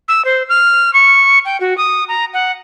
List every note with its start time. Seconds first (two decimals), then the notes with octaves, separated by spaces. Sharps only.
0.08 E6
0.25 C5
0.49 F6
0.93 C#6
1.45 G5
1.60 F#4
1.78 D#6
2.08 A#5
2.34 F#5